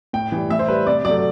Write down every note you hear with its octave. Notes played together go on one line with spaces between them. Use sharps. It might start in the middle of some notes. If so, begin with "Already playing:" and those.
A2 G5
E3 G3
A2 E5
C5
G3 B4
C3 D5
F#3 A3 D5